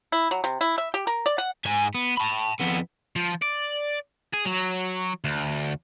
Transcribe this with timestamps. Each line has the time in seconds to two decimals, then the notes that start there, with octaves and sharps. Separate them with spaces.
0.12 E4
0.31 F#3
0.44 C3
0.61 E4
0.78 E5
0.94 G4
1.07 A#4
1.26 D5
1.38 F#5
1.65 G#2 G#5
1.95 B3
2.17 A5 B5
2.60 F2 B3
3.16 F3
3.42 D5
4.34 G#4
4.46 F#3
5.24 D2